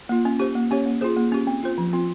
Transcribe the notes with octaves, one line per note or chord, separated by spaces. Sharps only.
A#3 F4
C#4
G4 C5
A#3
C#4 G4 C#5
A#3
F4 G#4 C5
A#3
C#4 G4
C4
F4 C5
F3
C4 F4